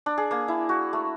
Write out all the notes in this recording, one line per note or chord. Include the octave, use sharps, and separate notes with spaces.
D4
G#4
A#3
E4
F#4
A3